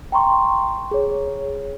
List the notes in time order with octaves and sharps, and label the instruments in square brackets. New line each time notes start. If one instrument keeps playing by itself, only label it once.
[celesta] G5 A#5 C6 C#6
G#4 C#5